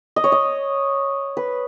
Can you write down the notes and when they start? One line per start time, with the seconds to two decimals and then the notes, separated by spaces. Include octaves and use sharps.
0.16 D#5
0.24 C#5
0.32 D#5
1.37 B4